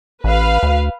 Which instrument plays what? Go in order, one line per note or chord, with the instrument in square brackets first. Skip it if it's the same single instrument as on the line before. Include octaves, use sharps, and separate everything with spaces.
[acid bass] A1 [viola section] B4 F5
[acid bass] D2